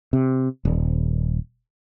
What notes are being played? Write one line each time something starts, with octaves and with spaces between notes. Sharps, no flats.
C3
D#1